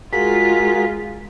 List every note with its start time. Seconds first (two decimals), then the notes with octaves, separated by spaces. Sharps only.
0.13 G#3 F4 F#4 G#4 A#4 B6